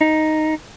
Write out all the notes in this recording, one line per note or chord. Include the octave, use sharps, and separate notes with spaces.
D#4